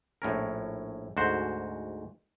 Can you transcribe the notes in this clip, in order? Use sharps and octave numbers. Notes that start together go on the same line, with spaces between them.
A#1 A2 C#4 A#4
D2 G#2 F#4 C5